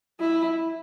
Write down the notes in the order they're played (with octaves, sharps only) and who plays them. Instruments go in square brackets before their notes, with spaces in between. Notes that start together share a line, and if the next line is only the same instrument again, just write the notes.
[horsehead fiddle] E4